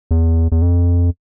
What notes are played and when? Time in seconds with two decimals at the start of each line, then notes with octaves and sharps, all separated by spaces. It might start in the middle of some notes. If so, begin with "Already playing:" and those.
0.11 E2
0.52 E2
0.62 F2